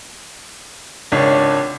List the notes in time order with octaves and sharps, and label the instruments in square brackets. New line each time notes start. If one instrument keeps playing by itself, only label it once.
[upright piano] G#1 C#2 D4 C#5 A5